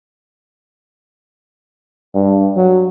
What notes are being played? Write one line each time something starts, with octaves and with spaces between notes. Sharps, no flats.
G2
F#3